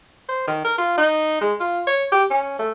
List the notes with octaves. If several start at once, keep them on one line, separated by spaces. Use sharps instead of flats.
C5
D#3
A#4
F4
D#4
G#3
F4
C#5
G4
C#4
A3